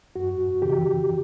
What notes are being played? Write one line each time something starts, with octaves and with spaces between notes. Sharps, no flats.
F#2 F#4
C#3 E3 G4